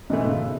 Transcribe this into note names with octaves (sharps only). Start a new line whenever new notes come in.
G#2 B2 E3 A3
C#3